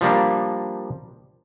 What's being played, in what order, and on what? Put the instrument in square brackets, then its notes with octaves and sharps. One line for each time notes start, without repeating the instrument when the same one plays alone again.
[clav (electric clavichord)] F3 G3 A#3 D4